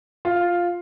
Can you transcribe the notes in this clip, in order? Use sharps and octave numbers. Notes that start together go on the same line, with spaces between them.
F4